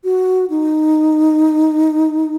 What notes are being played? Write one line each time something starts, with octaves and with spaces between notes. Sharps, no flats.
F#4
D#4